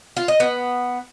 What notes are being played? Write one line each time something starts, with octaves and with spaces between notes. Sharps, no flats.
F4
D#5
B3